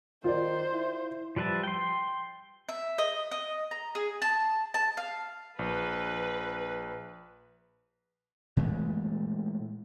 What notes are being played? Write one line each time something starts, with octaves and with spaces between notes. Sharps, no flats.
D#3 F4 C5 D5
E4
F3 G3 B4 E5 A5
G5 C6
E5
D#5
D#5
A#5
G#4
A5
A5
F5
A#1 B4
A#2 E3 G#3 A3